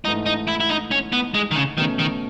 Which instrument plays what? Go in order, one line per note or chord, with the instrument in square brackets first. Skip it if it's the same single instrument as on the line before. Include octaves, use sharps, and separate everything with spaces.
[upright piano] G#2 E3 A3 [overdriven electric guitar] D#4
[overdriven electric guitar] D#4
E4
E4
D#4
C#4
B3
G#3
D#3
C#3
[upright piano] B2 A3 C#4 [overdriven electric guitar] D#3
[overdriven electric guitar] D#3